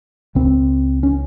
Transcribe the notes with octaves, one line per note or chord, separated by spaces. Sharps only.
C#2 C#3 C4
C#4